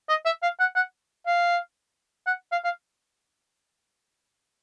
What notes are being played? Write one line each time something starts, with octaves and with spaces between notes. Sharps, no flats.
D#5
E5
F5
F#5
F#5
F5
F#5
F5
F5